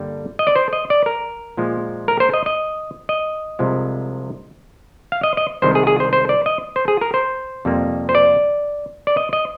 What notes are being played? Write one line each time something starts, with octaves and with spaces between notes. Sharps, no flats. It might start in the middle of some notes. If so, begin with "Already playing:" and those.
Already playing: G2 D3 G3 A#3
D#5
D5
C5
D#5
D5
A#4
A#2 F3 G#3
A#4
C5
D#5
D#5
D#5
C2 C3 F3 G#3
F5
D#5
D#5
C2 C3 D#3 G#3 C5
G#4
G#4
C5
C5
D5
D#5
C5
G#4
A#4
C5
F2 C3 G3 A#3
C5
D5
D5
D#5
D#5